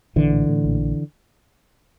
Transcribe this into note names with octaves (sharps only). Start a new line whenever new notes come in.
A#1 D3 E3
A2
A2
A#1